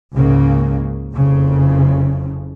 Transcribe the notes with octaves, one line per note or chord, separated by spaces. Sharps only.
C#2 G#2 C#3 A#3
F#1 F2 C#3